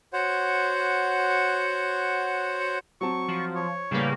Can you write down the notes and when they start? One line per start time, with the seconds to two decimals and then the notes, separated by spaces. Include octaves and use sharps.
0.13 F#4 C5 C#5 F#5
3.01 F#3 C4 A5 C#6
3.28 F3
3.55 C#5
3.91 A1 C#3 G3 A#3 B4